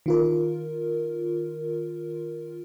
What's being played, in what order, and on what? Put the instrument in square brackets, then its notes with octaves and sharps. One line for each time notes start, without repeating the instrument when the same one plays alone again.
[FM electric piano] D#3 F4 A#4